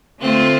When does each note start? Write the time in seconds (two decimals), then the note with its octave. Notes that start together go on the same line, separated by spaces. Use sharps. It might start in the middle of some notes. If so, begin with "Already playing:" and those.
0.19 D3 A3 C4 F4